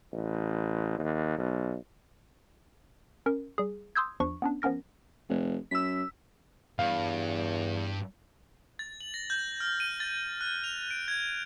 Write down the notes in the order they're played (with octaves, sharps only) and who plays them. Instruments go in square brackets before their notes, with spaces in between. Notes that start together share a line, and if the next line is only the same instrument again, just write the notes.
[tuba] A1
D#2
B1
[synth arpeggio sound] C#4 A#4
G3 G#4
C6 D#6 E6 G6 G#6
E2 F3 D4 C#6
B3 C#4 D4
F3 B3 C#4 A#4 A#6
[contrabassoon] F1
[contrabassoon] F#2 [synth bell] E6 B6
[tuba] E2 [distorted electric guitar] G2 [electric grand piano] F5
[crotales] A6
F#7
A#6
G6
F6
D#7
A6
F#6
F7
D7
G#6